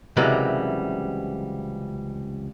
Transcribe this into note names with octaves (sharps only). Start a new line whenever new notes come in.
C#2 C3 E3 F#3 G3 A#4